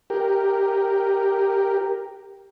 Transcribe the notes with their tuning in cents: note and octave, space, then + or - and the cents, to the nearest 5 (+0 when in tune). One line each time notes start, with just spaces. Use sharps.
G4 +0 A#4 +0